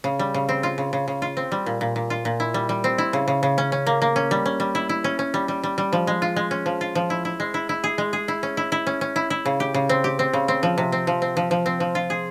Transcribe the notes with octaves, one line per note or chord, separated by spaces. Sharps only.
C#3
G3
C#3
C4
F4
C#3
C#3
C#3
F4
C4
G3
A#2
A#2
A#2
F4
A#2
E4
G3
G3
C4
E4
C#3
C#3
C#3
C#4
C#4
A#3
A#3
C#4
G3
C#4
G3
E4
E4
C#4
C#4
G3
G3
G3
G3
F3
G#3
F4
G#3
C#4
F3
F4
F3
E4
E4
G#3
E4
E4
G#4
G#3
G#4
E4
C#4
E4
E4
C#4
C#4
E4
E4
C#3
G4
C#3
C4
G4
C4
C#3
C4
F3
C3
C4
F3
C4
F3
F3
C4
F3
F4
G#4